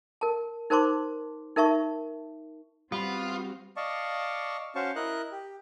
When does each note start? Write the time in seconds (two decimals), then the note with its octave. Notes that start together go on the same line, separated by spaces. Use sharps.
0.21 A#4 A5
0.70 D#4 A#4 C5 A5 C6 D6
1.56 D#4 A#4 E5 A5 C#6
2.92 G3 B3 C4 F4 F#4 B5
3.77 D5 D#5 F5 A5 C#6
4.75 C#4 F#4 C5 F5 A5 C#6
4.96 E4 A#4 D#5 F#6
5.32 G4